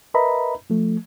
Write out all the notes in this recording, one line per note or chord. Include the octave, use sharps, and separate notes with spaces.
A#4 B4 D#5 E5 A#5 B5
F3 A3